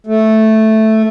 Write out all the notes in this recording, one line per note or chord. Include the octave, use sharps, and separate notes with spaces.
A3